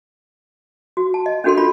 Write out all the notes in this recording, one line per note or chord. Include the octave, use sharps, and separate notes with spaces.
F#4
A5
D#5
C#4 D4 F#4 A4 A#4 C6
F4 B5